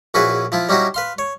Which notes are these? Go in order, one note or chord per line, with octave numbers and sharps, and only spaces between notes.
A#1 C#4 E4 F#4 G#4 B4
F3 E4 F4
G3 C#4 D#4 E4 F#4
B4 F5 C6
C#5